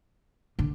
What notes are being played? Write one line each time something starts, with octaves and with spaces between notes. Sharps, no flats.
D3